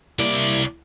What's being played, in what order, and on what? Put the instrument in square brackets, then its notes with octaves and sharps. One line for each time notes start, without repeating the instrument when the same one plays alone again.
[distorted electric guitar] C2 D5 [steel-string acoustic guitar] G3 A#3 E4